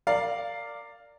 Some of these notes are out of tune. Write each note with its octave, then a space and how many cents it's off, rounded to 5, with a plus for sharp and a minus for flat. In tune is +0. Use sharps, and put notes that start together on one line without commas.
A#4 -25 D5 +0 F5 +0